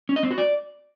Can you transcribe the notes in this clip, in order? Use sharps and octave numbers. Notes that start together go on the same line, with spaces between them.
C#4
D#5
C4
F#4
D5